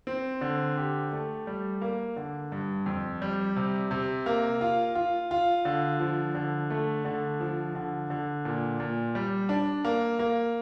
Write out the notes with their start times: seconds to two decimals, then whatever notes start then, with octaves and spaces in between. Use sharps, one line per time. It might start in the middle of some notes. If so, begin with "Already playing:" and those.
0.07 C4
0.41 D3
0.77 G4
1.12 A3
1.47 G3
1.81 A#3
2.16 D3
2.52 G2
2.86 F2
3.22 G3
3.56 C3
3.91 C3
4.26 A#3
4.61 F4
4.95 F4
5.31 F4
5.65 D3
6.00 F3
6.35 D3
6.70 A3
7.05 D3
7.40 F3
7.75 D3
8.10 D3
8.45 A#2
8.80 A#2
9.15 G3
9.49 D4
9.85 A#3
10.19 A#3